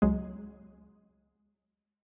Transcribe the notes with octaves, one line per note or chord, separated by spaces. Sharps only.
C#2 F#3 G#3